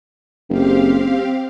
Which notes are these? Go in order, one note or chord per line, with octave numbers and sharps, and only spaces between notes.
F#1 C4 G4 F5